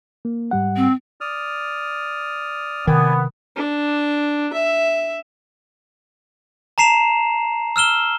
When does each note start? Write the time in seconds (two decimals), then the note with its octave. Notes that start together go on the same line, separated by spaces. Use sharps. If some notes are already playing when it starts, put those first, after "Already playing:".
0.25 A#3
0.51 G#2 G3 F#5
0.76 C4
1.21 D5 D#6 F6
2.87 C3 D#3 B3 D5 G#5
3.56 D4
4.53 E5
6.78 A5 A#5 C7 E7 F7
7.76 E6 F6 E7 G7